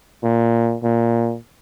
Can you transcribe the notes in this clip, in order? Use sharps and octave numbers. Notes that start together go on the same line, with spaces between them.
A#2
A#2